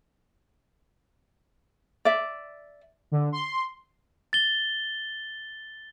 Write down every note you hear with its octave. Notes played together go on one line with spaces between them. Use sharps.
D5 E5
D3
C6
A6 G7